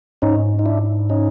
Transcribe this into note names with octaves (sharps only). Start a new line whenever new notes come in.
G#2 C#4 D#4
D#4
D4 E4
C#4 D#4